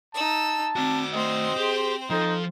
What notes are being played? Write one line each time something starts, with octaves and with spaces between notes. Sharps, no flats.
D#4 A5 E6
C4 F#4 D5 D6
A3 C4 C5 D#5
G4 G#4
F3 D#4 A4